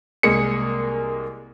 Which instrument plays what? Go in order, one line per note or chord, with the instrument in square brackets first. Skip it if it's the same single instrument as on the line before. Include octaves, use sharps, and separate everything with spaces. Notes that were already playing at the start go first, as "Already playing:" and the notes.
[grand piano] C2 G#3 A#3 G#4 G#5 C#7